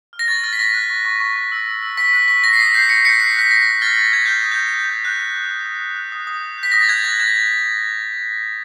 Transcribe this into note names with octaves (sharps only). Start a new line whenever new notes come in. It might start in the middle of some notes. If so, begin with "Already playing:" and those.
F6
A#6
C#6 A6
F6 A#6
B6
C#6 A#6
F#6
C#6
C#6
C#6
C#6
E6
E6
E6
C#6 B6
F#6 B6
C#6 B6
C#6 A#6
C7
D#6 B6
G6 C7
G6 B6 C#7
G6 B6 C#7
F#6 C7
F#6 B6
F#6 A#6
F#6
F6 A6
C#6
F6 G#6
F6 G6
D#6
G6
D#6
D#6
G6
F#6 G6
F#6
D#6
D#6
D#6
D#6
F#6
D#6
D#6
G6
G6
B6
D#6 A#6
A6
F#6 G#6
D#6 A6
F#6 G#6